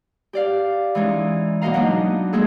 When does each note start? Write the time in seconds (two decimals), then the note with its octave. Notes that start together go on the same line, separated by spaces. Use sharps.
0.33 G4 D5 F5
0.95 E3 G#3 C#4 D#4
1.61 B2 A#3 F#4 D#5 F5 A#5
1.74 F#3 A#3 B3 D4 D#4
2.33 G#3 A#3 G#4 A4